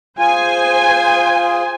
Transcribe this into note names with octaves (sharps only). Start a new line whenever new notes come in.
F4 G#4 C5 G#5